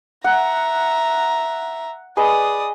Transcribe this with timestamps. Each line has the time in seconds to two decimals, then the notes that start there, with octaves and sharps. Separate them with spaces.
0.24 E5 F#5 A#5
2.17 G#4 B4 D5 D#5 D#6